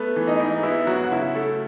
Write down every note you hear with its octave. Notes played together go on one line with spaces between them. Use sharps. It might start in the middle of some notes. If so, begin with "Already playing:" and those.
Already playing: A3 B3 B4
E3
D#4 D#5
G#2
B3 E4 E5
F#3 F#4 F#5
F#5
C#3 E4 E5
A3 A4